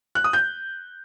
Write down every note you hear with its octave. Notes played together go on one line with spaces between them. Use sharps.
F#6
D#6
G6